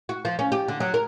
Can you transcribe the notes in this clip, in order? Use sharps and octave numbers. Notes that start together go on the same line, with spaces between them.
F#4
F3
C#4
G4
D3
F#3
A#4